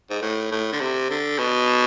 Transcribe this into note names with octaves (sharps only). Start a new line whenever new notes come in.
G#2
A2
A2
D3
C3
D3
B2